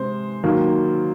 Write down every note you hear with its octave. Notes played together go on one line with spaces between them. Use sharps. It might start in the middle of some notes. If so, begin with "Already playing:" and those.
Already playing: C3 G#3 C5
D#3 F#3 A#3